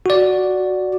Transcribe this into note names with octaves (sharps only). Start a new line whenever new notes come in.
F#4 D5